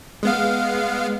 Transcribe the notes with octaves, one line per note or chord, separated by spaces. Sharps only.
G#3 B3 F5